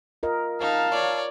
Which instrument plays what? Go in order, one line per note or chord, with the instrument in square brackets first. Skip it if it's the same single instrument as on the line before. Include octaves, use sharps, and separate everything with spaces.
[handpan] F4 A#4 D#5
[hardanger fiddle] D#4 [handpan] A#4 [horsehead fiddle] F5 A5
[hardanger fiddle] C#5 D5